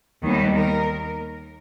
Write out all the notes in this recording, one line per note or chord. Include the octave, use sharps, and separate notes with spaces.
D#2 D#3 G3 B3
A#4